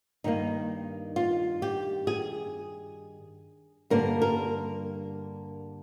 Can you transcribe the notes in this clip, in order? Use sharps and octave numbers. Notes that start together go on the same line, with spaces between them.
G2 D#3 A#3 D#4
F4
G4
G#4
G2 D3 G3 A#3 A#4
A#4